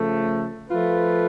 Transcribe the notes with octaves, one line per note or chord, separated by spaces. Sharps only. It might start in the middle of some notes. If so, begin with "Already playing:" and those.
Already playing: C#3 F3 A3
F3 A3 F4 B4